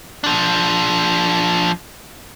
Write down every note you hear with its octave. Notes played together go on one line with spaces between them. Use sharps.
F3 D4